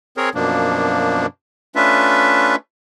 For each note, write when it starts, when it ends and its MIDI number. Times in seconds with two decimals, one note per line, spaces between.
0.17 0.30 60
0.17 0.30 68
0.17 0.30 70
0.17 0.30 73
0.35 1.26 42
0.35 1.26 47
0.35 1.26 53
0.35 1.26 58
0.35 1.26 62
1.75 2.56 57
1.75 2.56 61
1.75 2.56 62
1.75 2.56 65
1.75 2.56 71
1.75 2.56 76